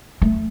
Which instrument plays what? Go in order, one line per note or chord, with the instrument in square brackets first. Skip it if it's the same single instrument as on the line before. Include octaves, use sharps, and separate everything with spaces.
[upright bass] A3